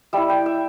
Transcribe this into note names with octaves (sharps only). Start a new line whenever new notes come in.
G3 E4 E5
G5
E5